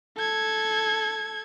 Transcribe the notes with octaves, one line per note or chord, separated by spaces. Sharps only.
A4 G#6